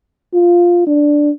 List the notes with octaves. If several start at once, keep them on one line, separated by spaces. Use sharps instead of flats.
F4
D4